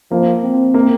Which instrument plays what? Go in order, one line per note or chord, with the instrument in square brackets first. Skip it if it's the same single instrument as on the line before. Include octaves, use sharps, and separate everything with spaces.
[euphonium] F3 [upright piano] A#3
[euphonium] C4
[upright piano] A#3